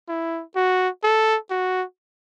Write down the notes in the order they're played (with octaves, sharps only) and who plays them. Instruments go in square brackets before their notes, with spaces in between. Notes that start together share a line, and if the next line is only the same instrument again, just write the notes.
[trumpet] E4
F#4
A4
F#4